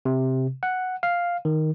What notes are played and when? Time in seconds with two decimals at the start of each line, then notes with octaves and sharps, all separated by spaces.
0.05 C3
0.63 F#5
1.03 F5
1.45 D#3